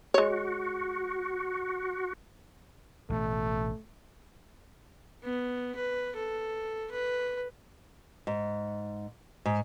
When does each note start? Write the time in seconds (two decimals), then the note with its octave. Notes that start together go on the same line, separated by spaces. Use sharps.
0.14 G#3 F#4 C#5
3.09 A1 B2 A3
5.23 B3
5.75 B4
6.16 A4
6.91 B4
8.27 G#2
9.46 G#2